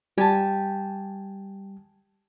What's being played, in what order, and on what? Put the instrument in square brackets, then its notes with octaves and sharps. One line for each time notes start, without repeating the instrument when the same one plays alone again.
[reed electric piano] G3 [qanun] G4 [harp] G#5 A5